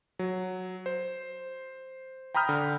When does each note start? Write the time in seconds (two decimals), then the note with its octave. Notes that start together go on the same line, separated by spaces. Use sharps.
0.19 F#3
0.86 C5
2.35 G5 A#5 B5 D#6 F6 G6
2.49 D3